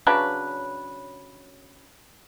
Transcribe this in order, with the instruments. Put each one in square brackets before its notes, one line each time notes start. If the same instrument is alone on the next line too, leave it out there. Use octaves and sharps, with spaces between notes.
[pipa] C#3 F#3 D4 B4